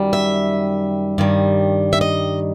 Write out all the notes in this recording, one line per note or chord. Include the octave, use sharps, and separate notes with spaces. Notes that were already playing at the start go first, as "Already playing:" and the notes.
Already playing: F#2 D#3 G3
E5
G2 D#3 G3
E5
D#5